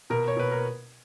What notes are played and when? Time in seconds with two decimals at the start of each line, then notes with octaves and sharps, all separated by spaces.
0.10 B2 A#4
0.28 C#5
0.37 B2 B4
0.51 A#4